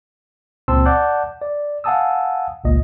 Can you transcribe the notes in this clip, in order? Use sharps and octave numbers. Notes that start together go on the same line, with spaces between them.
C#2 A#2 C4 A5 C6 E6
D5 F#5 A5 D6 F#6 G6
D5
F5 F#5 G#5 A5 D#6 E6
G#1 C#2 A#2 D#5